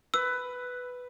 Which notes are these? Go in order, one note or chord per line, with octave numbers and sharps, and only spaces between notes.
B4 E6